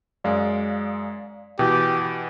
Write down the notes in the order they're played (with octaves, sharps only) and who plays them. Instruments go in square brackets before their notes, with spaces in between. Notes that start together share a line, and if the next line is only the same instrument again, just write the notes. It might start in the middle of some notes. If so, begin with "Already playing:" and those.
[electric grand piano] F#2 G#3 [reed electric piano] D5 F5
[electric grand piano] B2 E3 [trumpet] G4